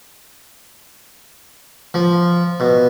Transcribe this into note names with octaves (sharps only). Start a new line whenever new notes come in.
F3
B2